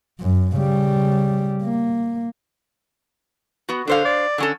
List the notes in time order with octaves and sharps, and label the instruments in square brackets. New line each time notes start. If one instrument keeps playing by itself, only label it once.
[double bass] F#2
C#3 G3
A#3
[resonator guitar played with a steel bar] B3 F#4
[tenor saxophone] D3 [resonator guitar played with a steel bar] D4 C5 F5
[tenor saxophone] D5
[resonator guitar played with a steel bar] D3 C#4 A4